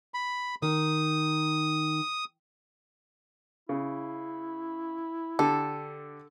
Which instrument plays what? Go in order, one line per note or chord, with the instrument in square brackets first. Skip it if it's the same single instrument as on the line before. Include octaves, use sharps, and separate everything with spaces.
[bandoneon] B5
[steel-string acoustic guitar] D#3 [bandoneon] D#6
[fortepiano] C#3 [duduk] E4
[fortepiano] D3 G4 [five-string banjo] A4